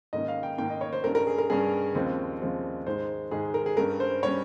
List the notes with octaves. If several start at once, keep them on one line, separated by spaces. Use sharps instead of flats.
G#2 D#3 A#3 C#4 D#5
F5
G5
G#2 D#3 A#3 C#4 G5
D#5
C#5
C5
G2 G3 C#4 A#4
A#4
G#4
A#4
G2 G3 C#4 G#4
D#2 C#3 F3 G#3 C4
D#2 C#3 F3 G#3 C4
G#2 D#3 G#3 C5
G#2 D#3 G#3 G#4
A#4
G#4
G2 G3 C#4 A#4
C5
C#5
G3 C#4